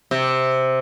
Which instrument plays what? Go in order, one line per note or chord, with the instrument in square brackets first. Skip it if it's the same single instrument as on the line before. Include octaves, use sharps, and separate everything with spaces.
[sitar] C3